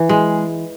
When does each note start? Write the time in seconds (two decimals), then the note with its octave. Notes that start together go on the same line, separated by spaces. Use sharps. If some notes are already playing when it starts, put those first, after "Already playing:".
Already playing: E3
0.09 G#3